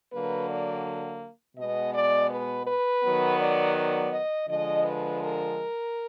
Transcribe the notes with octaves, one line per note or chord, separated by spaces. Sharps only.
D3 F#3 A#3 B4
D5
B2 G#3 B3 D#5
D5
B4
B4
D#3 F#3 B3
D5
D5
D#5
D3 F3 G#3 D#5
B4
A#4